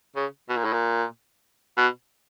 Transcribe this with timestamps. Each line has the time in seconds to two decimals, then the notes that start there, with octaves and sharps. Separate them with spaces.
0.16 C#3
0.49 B2
0.57 A#2
0.64 A2
0.73 A#2
1.77 B2